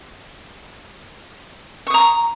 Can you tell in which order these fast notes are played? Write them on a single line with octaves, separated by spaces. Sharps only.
C#6 D#6 A#5